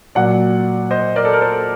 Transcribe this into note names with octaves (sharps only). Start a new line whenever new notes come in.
A#2 F#3 D5 F#5
C5 D#5
A#4 D5
A4
A#4
A4 C5